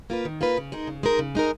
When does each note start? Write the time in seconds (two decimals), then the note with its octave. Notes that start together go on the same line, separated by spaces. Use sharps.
0.10 A#3 F4 B4
0.25 D#3
0.41 A#3 F4 B4
0.57 C#3
0.72 G#3 D#4 A#4
0.87 C#3
1.03 G#3 D#4 A#4
1.19 C#3
1.35 G#3 D#4 A#4